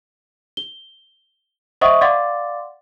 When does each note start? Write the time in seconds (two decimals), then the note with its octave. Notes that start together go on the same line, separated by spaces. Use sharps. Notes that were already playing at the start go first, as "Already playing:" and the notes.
0.57 G7
1.81 C5 D#5 E5 F#5 C#6 D#6
2.01 D5 F5 F#5 C6 D6 A6